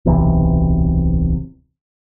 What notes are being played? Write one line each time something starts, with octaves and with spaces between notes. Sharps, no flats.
D1 B1 C3 E3